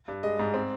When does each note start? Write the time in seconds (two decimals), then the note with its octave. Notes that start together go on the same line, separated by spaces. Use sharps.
0.08 G2
0.23 G#3 D#5
0.39 G#2
0.54 C4